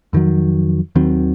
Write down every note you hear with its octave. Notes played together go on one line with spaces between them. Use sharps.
F2 D#3 F#3
D#2 D#3 F#3 C4